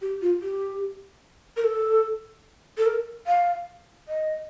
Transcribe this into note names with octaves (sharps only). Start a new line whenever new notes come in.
G4
F4
G4
A#4
A4
A4
A#4
F5
D#5